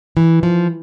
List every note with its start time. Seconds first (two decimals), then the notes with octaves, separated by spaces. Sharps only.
0.17 E3
0.43 F3